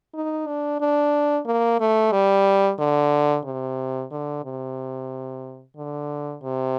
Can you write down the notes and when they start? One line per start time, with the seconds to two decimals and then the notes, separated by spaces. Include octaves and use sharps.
0.14 D#4
0.47 D4
0.81 D4
1.46 A#3
1.80 A3
2.12 G3
2.79 D3
3.45 C3
4.11 D3
4.44 C3
5.76 D3
6.43 C3